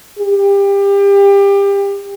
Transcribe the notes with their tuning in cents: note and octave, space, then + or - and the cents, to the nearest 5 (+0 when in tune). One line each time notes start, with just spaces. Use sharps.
G4 +25